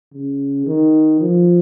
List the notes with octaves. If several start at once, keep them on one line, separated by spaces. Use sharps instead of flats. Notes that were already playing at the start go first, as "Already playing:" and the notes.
C#3
D#3
F3